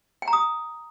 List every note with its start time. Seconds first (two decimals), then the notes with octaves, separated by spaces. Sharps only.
0.22 G5
0.28 A#5
0.33 D#6